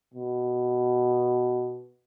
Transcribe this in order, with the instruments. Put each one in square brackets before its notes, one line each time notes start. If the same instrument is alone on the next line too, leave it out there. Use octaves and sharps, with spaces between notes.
[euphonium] B2